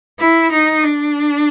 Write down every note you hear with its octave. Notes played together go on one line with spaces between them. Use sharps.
E4
D#4
D4